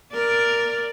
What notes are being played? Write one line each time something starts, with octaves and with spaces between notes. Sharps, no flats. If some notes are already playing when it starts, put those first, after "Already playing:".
A#4 D5